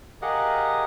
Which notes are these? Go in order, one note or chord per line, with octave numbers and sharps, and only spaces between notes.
G4 G#4 A#4 D#5 F5 F#5